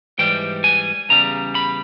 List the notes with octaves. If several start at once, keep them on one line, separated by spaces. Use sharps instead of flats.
G#2 E3 G3 G5
G#5
E2 C#3 G3 A#5
B5